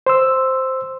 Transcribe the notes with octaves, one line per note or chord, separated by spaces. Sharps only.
C5 C6 E6